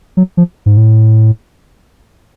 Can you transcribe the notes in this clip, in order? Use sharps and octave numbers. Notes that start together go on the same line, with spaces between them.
F#3
F3
G#2
A2